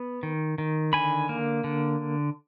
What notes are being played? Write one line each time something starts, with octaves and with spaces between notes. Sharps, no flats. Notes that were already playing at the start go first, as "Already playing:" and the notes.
Already playing: B3
D#3
D#3
D3 G#5 B5
A#3
D3